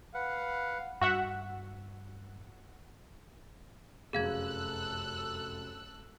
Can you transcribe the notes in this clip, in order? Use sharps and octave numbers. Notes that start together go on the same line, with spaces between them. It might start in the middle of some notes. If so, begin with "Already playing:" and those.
B4 F5 F#5
G2 F#4 E5 F#5
F1 F#2 G#4 A4 F5 E6 F#6 G#6